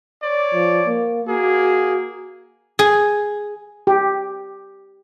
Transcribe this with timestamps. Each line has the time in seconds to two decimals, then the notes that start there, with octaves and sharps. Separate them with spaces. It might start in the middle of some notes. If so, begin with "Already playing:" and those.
0.23 C#5 D5
0.55 F3
0.87 A#3
1.29 A#3 F#4 G#4
2.79 G#4
3.87 G4